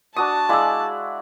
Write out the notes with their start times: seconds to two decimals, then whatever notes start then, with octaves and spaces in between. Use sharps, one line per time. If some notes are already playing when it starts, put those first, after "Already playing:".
0.16 D4 F#4 A5 D#6
0.49 G#3 E4 D5 F5 E6